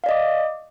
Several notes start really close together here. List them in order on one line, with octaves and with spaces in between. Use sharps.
F5 D5 D#5 D6